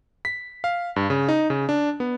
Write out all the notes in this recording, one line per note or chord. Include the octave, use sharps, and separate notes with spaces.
B6
F5
G2
C#3
D#4
C#3
D4
B3